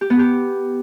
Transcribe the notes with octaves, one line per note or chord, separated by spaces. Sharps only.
G4
B3
G4